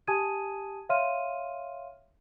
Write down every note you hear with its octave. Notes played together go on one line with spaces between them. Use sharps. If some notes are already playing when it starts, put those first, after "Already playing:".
G4 G#5 A5 D#6 G#6 D#7
C#5 E5 F5 C6 F6 D#7